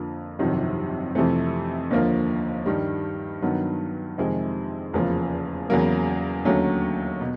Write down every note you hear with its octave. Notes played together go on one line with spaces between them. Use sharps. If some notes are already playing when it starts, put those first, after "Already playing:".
Already playing: F2 D3 F3 A#3
G1 F2 C3 D#3 F#3
F2 C3 E3 A3 C4
D#2 D3 F3 A#3
G2 D#3 G3
G2 D#3 F#3 B3
F2 C3 D#3 G#3 C4
F1 E2 C#3 F3 A#3
E2 C#3 F#3 A#3
D#2 D3 F#3 A3 C#4
B2